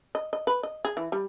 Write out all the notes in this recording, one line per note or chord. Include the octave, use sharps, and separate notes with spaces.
D#5
D#5
B4
D#5
G#4
E3
G3